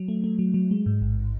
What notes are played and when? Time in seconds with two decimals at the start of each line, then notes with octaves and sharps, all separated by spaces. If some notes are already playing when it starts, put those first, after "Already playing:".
Already playing: F#3
0.08 A3
0.24 A3
0.39 F#3
0.54 F#3
0.71 G#3
0.86 G#2
1.01 A1